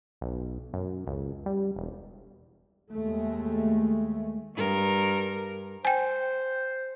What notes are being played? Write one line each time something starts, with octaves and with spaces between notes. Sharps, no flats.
B1
F#2
C#2
G3
E1
D#2 G#3 A3
G2 A#4
C5 G5 G#5